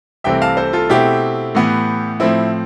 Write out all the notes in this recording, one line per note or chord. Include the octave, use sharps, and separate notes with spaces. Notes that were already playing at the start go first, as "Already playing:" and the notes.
C2 C3 E3 A3 C4 E5 G5
F5 A5
A4 C5
F4 A4
B2 A3 C4 E4 G4
A2 E3 B3
A2 F3 C4 E4